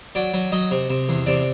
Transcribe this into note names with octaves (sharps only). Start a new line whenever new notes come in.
F#3 D5
F#3
F#3 D#5
C3
C3
E2
C3 D5